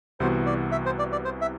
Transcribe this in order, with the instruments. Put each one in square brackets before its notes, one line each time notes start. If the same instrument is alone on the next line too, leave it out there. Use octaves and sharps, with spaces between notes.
[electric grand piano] C2 C3 E3 B3 F#4 [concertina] C5
[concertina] D5
E5
C5
D5
D5
C5
E5